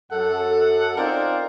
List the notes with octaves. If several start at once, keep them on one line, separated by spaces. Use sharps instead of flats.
F#2 A4 F#5
C4 D#4 F4 A#4 C5 D5